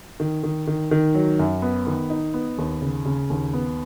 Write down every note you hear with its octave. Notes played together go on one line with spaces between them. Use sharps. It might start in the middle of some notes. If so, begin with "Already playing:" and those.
D#3
D#3
D#3
D#3
F#3
F#2
B3
D#3
D#4
B3
D#2
C#3
C#3
D#2
B3